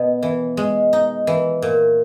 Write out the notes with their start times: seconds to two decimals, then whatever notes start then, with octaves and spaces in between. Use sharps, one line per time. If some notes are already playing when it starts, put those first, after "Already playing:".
Already playing: B2
0.23 E3
0.57 G#3
0.93 D#4
1.27 E3
1.62 A#2